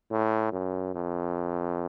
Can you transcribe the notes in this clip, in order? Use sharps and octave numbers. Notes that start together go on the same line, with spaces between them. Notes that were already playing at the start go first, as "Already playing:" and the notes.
A2
F#2
F2